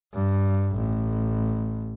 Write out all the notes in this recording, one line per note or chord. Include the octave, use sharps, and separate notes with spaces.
G2
A1